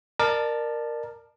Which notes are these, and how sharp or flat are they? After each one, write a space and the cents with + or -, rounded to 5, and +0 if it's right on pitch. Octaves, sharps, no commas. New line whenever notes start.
A#4 +0 D5 +30 A5 +0